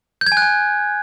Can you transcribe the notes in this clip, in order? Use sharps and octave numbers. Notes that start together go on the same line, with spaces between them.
G6
G#6
G#5
F#6
G#5